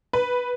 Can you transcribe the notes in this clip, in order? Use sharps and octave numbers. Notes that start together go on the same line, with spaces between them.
B4